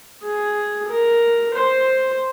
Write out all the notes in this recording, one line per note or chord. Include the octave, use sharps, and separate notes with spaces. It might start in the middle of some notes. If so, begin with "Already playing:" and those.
G#4
A#4
C5